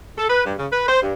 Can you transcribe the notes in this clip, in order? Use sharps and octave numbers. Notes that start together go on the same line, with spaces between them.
A4
B4
G2
C#3
B4
C5
G2